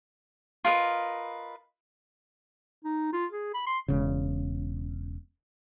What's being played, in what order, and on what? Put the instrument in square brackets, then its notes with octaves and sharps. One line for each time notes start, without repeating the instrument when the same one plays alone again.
[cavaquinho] F4 A#4 B4 D#5
[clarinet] D#4
F4
G#4
B5
C6
[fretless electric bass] E1 C#3